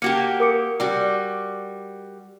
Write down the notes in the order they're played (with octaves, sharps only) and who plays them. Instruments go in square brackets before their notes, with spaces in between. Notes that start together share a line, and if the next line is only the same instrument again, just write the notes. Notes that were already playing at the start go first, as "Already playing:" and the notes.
[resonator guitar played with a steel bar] A#3 F#4 G4 [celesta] C#7
[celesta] A#4 D6 C#7
[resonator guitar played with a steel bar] G3 F#4